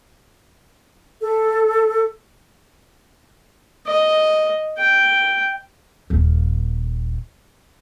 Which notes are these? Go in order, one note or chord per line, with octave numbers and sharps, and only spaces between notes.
A4
D#5
G5
D#1 A#3